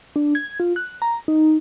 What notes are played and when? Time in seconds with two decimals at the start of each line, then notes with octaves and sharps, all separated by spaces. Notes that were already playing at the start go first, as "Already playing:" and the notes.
0.16 D4
0.35 G#6
0.60 F4
0.76 F#6
1.02 A#5
1.28 D#4